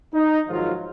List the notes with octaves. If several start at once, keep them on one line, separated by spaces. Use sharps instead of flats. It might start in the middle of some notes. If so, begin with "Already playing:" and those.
D#4
G#2 D#3 F3 F#3 F4